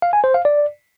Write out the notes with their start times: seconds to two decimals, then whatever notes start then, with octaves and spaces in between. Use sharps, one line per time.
0.02 F5
0.13 G#5
0.24 C5
0.34 F5
0.45 D5